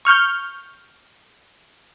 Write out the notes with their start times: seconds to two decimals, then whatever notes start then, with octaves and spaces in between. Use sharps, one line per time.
0.05 C#6 F6 G6